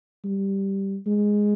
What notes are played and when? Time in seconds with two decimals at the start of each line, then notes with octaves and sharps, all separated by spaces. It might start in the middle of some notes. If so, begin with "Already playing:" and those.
0.24 G3
1.06 G#3